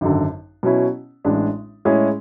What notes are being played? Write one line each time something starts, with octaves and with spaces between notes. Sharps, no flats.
G#1 F#2 D3
B2 F#3 C#4 E4
A1 A2 G#3 D4
A2 G#3 C#4 E4 G#4